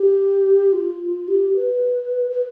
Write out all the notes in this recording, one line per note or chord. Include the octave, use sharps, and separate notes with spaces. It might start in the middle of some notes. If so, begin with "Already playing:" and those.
Already playing: G4
F4
G4
B4
B4